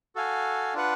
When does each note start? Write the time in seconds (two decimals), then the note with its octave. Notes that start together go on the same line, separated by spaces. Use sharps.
0.15 F#4 A4 F5 G#5
0.74 D4 F4 B4 F#5